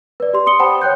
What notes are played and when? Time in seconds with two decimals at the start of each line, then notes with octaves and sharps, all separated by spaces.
0.20 B4 D5
0.34 G4 C6
0.46 C6 D#6 C#7 G7
0.59 C5 F#5 G5 A5 B5 D#6
0.82 C#5 G5 F#6 G6